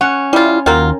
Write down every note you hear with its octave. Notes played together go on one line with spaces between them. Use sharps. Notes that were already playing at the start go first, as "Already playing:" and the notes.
C#4 F#5
G3 E4 F4
D#2 F#3 F4 A#4 G5